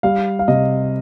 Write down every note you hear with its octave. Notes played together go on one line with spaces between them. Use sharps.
G3 F5
F5
C3 D#5